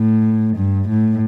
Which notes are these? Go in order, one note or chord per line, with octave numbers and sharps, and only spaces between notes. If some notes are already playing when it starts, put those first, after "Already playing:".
Already playing: A2
G2
A2